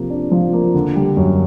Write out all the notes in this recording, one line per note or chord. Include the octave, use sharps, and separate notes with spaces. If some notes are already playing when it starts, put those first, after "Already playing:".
Already playing: C3 F3 A#3
D4
F3
A#3
D3
G3
F#2